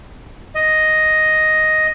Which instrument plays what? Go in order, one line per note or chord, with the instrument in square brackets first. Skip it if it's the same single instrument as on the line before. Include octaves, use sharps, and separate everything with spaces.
[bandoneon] D#5